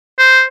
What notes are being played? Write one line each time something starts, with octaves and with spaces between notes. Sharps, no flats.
C5